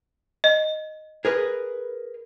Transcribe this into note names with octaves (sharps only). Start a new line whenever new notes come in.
D#5
G#4 A#4 B4